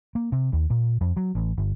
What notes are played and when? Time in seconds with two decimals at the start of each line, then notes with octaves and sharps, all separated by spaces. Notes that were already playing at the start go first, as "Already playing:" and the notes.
0.15 A#3
0.32 C3
0.53 D#2
0.70 A#2
1.01 F2
1.17 F#3
1.35 A1
1.58 G1